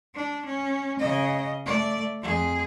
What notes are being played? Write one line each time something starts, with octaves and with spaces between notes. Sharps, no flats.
D4
C#4
C#3 D#5
A3 D5
F2 G#4